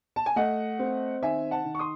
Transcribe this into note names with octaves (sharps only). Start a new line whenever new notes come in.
A5
G#5
A3 D#5 F#5
C4
D#3 E5 G#5
F#5 A5
D#3
C#6
C6 D#6